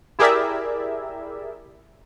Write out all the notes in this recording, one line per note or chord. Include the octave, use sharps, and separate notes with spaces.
E4 G4 G#4 A#4 D5 E5